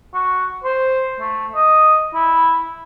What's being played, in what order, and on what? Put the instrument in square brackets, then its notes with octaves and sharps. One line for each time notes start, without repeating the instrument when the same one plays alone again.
[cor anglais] F#4
C5
A3
D#5
E4